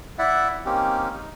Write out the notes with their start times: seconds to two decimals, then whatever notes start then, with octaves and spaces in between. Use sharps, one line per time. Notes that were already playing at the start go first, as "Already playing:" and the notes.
0.19 E4 D5 E5 F#5
0.65 A#3 C4 C#4 D#4 G4
1.13 D#4